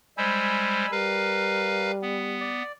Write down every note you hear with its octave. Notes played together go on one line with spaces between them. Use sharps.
G3 G#3 C5 G#5 B5 E6
G3 A#4 B4 F5
B3
D5